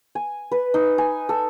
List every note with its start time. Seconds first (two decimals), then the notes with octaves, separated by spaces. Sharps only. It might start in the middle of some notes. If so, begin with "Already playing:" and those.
0.15 G#5
0.52 B4
0.74 D#4
0.98 G#5
1.29 A4